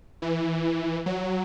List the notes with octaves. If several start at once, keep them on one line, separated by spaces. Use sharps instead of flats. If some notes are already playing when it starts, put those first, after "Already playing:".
E3
F#3